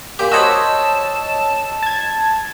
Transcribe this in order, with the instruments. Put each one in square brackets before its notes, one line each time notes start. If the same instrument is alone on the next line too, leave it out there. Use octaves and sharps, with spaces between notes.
[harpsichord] A#2 G4
[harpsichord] F#4 C5 B5 [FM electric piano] C#5 D#5 E6 [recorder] A5
[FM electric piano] A5 G#6